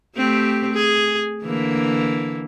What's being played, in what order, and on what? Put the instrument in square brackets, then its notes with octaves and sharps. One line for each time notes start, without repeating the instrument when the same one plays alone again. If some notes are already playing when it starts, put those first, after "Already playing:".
[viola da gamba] A3 C4 G4
G#4
D3 E3 A#3